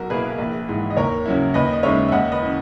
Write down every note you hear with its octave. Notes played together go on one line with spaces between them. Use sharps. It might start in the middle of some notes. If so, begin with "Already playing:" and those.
Already playing: B1 F#4 A#4
B2 A#3 E4 G#4 B4
A#1
G#2 E3
D#5
D#2 A#4 C#5
C#3 F#3 C#4 E4
D#2 B4 D#5
D#5
C#3 G#3 D#4 C#5 E5
E5
D#2 D#5 F#5
B4 D#5
C#3 E3